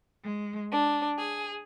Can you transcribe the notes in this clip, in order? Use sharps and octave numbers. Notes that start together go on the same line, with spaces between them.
G#3
D4
G#4